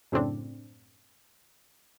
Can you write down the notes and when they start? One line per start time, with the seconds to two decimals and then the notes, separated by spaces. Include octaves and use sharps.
0.12 F#2 A2 C#3 C4 D4